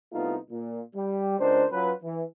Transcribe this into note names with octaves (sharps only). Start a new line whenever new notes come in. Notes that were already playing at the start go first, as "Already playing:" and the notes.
C2 A3 B3 D#4 F4
A#2
G3
C#2 D4 A#4 C5
F#3 C#4 F4 B4
E3